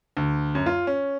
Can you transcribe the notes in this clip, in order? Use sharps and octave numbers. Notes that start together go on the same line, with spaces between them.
D2
F#2
F4
C#4